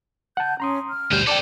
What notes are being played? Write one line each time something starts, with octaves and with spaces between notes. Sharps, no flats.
F#5 A5 G6
C#4 A#5 C6 D#6
F6
D2 B2 G3 C5 G6
A4 C5 D5 G5 A5 D6